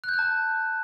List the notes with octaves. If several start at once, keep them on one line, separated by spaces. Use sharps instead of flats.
F#6
G6
F#6
A5